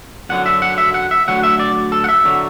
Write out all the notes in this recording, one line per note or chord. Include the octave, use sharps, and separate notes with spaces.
F#2 D3 F#3 F#5
E5
F#5
E5
F#5
E5
D2 D3 F#3 F#5
E5
D5
A4
F#5
E5
D3 F#3